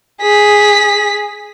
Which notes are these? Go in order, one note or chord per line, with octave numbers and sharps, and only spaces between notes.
G#4 B6